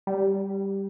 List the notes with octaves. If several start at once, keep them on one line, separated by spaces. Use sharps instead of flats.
G3